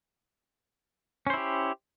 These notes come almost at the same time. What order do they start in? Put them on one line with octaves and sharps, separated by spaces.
C#4 C5 E4 G4